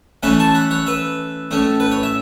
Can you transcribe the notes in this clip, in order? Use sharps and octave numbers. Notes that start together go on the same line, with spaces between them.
E3 A3 C#4 E4 F#5 B5
A5 C#6
F#5 B5
C#5 F#5
B4 E5
A2 A3 C#4
B4
C#5
E5